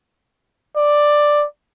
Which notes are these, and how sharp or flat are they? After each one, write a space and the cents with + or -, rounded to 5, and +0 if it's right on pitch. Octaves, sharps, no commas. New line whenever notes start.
D5 +5